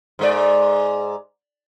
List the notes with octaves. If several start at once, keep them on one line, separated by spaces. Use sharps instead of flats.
G#2 G#3 D5